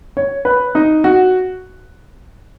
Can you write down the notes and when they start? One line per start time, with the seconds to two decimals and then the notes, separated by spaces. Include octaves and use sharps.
0.17 C#5
0.45 B4
0.75 D#4
1.04 F#4